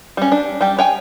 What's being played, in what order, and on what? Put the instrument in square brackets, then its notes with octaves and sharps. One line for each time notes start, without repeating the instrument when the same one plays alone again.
[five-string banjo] G3 C#4
D4
G3 G4
C#5 G5 G#5